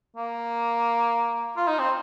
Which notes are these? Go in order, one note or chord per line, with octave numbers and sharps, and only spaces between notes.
A#3
F4
D#4
C4